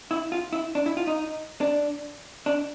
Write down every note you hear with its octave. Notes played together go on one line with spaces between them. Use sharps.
E4
F4
E4
D4
E4
F4
D#4
D4
D4